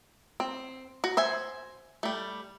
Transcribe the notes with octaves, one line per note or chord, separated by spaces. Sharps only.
C4
F#4
C5 E5 G#5
G3 A3